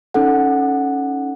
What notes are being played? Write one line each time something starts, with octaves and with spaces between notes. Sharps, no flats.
C#4 D#4 A4 F#5